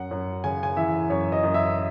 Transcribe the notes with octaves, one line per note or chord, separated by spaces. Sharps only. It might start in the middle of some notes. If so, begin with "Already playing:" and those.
Already playing: F#2 F#5
F#2
C#3 G#5
G#5
E3 E5
F#2 C#5
D#5
F#2
E5